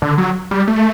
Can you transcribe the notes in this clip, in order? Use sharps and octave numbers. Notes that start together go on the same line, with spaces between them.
D3
F#3
G3
A3